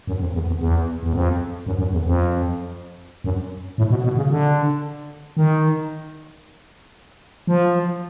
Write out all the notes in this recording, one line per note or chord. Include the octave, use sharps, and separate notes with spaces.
F#2
F2
E2
E2
E2
E2
F2
F#2
F#2
E2
F2
F#2
A2
B2
B2
C#3
D3
D#3
F3